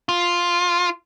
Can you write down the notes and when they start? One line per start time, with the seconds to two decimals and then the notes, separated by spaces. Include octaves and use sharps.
0.09 F4